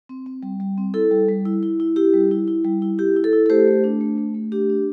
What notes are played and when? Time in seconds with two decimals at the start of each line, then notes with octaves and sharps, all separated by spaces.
0.09 C4
0.26 C4
0.43 G3
0.60 G3
0.78 C4
0.94 E4 A4
1.11 G3
1.29 G3
1.46 E4
1.63 E4
1.80 E4
1.96 E4 G4
2.14 G3
2.31 E4
2.48 E4
2.65 G3
2.82 E4
2.99 E4 G4
3.16 E4
3.24 A4
3.33 E4
3.46 A4
3.50 A3 G4 C5
3.67 A3
3.84 D4
4.01 A3
4.18 A3
4.34 A3
4.52 D4 G4
4.69 D4